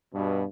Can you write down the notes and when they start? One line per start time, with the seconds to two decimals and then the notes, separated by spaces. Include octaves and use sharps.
0.12 G2 B2